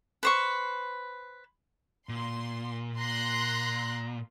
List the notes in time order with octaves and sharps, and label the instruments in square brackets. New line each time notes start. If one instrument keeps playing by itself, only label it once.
[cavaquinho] B4 C5 C#6
[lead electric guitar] A#2 [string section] C6
[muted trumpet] A#5 [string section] C6 F#6